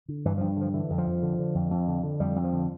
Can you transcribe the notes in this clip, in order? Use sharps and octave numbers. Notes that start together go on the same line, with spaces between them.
D3
G2 E3
G2 F3
D3 F3
D3 E3
F2
F3
F2
D3
D3
F2
F2
D3
D3
F2 G3
F2
F3
D3